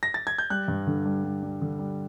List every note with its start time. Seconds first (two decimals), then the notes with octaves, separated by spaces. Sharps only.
0.03 A#6
0.14 A6
0.27 G#6
0.38 G6
0.50 G3 F#6
0.68 G2
0.87 D3
1.05 G3
1.24 G3
1.43 G3
1.61 D3
1.79 G3